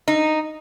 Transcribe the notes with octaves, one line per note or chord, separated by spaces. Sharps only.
D#4